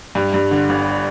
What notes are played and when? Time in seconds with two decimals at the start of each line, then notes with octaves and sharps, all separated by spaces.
0.15 G2
0.34 G2
0.51 D3
0.69 G1